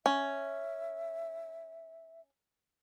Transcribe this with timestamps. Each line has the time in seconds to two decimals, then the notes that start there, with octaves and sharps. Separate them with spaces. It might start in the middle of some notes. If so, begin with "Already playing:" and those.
0.06 C#4 E5